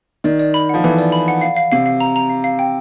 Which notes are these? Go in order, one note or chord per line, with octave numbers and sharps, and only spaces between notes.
D#3 D5
D5
B5
F3 F#5
E3 A4
D5
B5
F#5
F5
F5
C3 F5
F5
A#5
A#5
F5
F5
G5